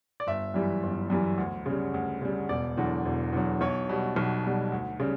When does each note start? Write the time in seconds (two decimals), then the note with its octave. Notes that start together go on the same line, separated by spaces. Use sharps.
0.20 D5
0.27 G1 E5
0.54 F#2 E3 G3
0.83 G1
1.10 F#2 E3 G3
1.38 D2
1.66 C#3 G3
1.94 D2
2.22 C#3 G3
2.49 E1 D5
2.77 E2 D3 F#3
3.05 E1
3.33 E2 D3 F#3
3.61 B1 C#5
3.89 B2 G3
4.16 B1
4.44 B2 G3
4.72 D2
5.00 C#3 G3